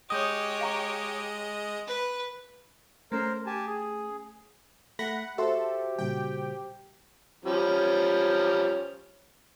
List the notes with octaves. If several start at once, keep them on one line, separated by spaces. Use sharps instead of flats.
G#3 G4 C#5 D#5 D#6 G6
F5 A#5 C#6
B4
A3 C#4 A#4 C5
G4 G#5 A5
G#4
A3 F#5 B5 A#6
F#4 G4 A4 C5 E5 C6
A#2 C#3 G3 G5
F3 G3 C#4